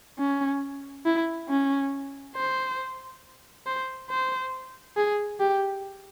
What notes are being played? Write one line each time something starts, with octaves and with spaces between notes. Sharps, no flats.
C#4
E4
C#4
C5
C5
C5
G#4
G4